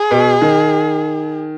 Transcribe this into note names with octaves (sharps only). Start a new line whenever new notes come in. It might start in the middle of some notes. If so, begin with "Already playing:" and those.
Already playing: G#4
B2
D#3